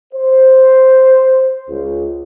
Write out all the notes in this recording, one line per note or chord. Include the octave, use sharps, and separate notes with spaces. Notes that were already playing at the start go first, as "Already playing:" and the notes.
C5
C#2